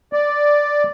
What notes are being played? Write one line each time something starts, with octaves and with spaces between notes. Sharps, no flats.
D5